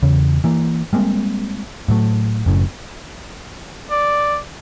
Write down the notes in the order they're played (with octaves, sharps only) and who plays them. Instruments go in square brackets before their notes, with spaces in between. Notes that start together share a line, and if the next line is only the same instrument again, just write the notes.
[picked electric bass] E2 C#3
E3 A#3
G3 G#3 A#3 C4
A2 F#3 A3
F#1 F#2 A2
[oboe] D5